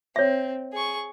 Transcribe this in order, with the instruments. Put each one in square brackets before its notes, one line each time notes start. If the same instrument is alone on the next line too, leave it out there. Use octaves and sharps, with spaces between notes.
[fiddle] C4 [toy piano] C#5 E5
[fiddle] G#4 C#6